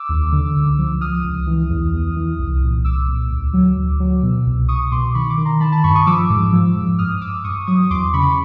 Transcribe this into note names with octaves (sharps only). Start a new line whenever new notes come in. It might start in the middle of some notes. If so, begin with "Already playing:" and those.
Already playing: D6 E6
D#2
D3
C#2
F3
F3 D#6 F6
C#2
E3
E2
E2
E3
C2
A#2
C2 D6 E6
A#2
D2
F#3
D2
F#3
B2
C2
C2 C#6 D#6
B2 C6 D6
D#3 B5 C#6
C6 D6
D#3
A#5 C6
D#3 A5 B5
A5 B5
G2 B5 C#6
C#6 D#6
F3 D6 E6
G#2
F3
G#2
G2 D#6 F6
G2 D6 E6
G2 C#6 D#6
F#3 C#6 D#6
E2 C6 D6
C#3 B5 C#6